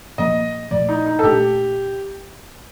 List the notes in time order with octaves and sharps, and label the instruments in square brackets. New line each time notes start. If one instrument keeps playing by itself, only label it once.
[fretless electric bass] A#2 F3 A#3 [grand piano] D#5
[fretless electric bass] A#2 F3 A3 [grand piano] D5
[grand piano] D#4
D#4
A4
[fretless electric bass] A#2 A3 D4 [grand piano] G4